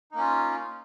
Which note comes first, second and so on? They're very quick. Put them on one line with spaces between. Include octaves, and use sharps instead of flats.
D#4 A#3 C#4 F4